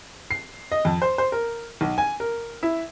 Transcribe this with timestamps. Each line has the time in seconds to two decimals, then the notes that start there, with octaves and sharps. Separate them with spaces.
0.31 C7
0.72 D#5
0.85 F2
1.02 C5
1.18 C5
1.32 A#4
1.81 B1
1.98 G#5
2.20 A#4
2.63 E4